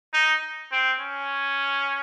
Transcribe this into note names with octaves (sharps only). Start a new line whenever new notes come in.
D#4
C4
C#4